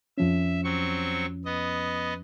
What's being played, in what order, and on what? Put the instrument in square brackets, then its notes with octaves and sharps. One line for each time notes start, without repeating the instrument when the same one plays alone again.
[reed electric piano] F2 F3 C#4 [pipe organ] E5
[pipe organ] F#3 C4 C#6
B3 D#5